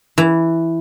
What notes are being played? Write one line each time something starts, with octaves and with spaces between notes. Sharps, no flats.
E3